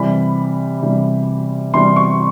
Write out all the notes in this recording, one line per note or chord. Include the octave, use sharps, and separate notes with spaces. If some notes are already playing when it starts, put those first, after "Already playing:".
Already playing: C3 E3 G3 B5
C3 E3 G3
C3 E3 G3 C6
C#6